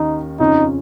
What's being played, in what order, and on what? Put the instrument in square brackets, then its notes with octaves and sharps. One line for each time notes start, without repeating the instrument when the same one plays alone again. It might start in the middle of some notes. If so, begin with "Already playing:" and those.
Already playing: [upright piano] D#2 D#3 C#4 [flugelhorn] D#4
[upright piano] F2 C#3 F3 C#4 [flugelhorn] D#4